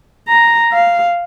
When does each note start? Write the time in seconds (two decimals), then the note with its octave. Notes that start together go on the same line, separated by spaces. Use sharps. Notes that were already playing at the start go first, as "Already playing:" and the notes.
0.29 A#5
0.73 F5